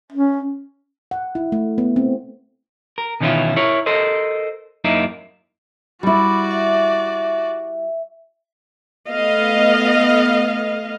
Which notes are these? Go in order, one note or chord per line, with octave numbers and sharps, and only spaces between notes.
C#4
F#5
E4
A3
B3
C4
A#4
B2 D#3 E3 C#4 E4 F4
E4 A#4 C#5
A4 A#4 C5 D#5
F#2 A#3 D#4 E4 A#4
G3 E4 F#4 D5 B5 D6
E5
A3 B3 D#5 F5